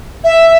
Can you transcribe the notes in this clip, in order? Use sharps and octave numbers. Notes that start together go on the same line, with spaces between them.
E5